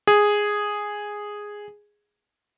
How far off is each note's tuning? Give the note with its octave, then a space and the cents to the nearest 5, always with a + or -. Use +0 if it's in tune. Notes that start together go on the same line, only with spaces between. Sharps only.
G#4 -5